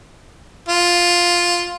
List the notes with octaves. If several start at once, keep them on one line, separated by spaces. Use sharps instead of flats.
F4